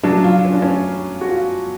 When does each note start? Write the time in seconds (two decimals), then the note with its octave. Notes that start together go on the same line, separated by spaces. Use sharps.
0.03 C#3 F#3 D4
0.24 F4
0.45 C#4
0.54 D4
0.62 C#4
1.21 F#4
1.28 F4